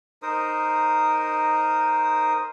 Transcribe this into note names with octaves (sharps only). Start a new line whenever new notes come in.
D#4 A#4 C5 D#6